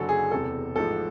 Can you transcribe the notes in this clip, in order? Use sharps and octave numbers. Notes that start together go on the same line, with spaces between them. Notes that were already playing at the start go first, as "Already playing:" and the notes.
Already playing: F#1 F#2 D3 F#3 A4
G#4
E1 E2 C3 A4
A1 G#2 F3 A4